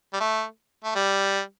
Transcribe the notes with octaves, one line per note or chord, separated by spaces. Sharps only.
G3
A3
A3
G3